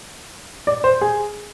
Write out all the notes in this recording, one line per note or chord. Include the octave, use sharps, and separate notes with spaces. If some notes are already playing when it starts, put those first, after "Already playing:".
D5
C5
G#4